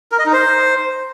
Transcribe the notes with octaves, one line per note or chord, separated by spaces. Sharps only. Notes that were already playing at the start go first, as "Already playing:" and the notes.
A#4
D#5
D#4
C5